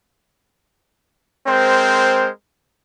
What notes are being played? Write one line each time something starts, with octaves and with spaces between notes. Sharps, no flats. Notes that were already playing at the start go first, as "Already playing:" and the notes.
G#3 C4 A#4 C5